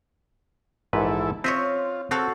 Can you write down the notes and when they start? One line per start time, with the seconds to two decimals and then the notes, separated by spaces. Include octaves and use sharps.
0.93 A#1 G#2 E3 E4 A4 B4
1.44 C4 F4 C#5 D#5 E5
2.11 C4 F#4 A4 F5